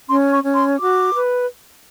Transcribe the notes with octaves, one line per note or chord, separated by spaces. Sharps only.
C#4 C6
C#6
C#4
C6
F#4 D6
B4